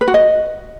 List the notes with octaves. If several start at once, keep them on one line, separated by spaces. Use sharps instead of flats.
B4
F#4
D#5